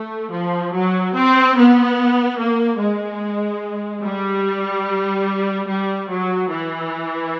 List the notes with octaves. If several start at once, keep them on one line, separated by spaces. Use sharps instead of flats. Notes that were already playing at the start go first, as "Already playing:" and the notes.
Already playing: A3
F3
F#3
C4
B3
A#3
G#3
G3
G3
F#3
E3